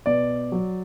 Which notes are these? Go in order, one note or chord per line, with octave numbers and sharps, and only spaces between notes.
B2 D5
F#3